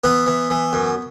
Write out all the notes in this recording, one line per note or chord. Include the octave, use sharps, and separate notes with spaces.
E3 B3 B4
E3
E3
F#2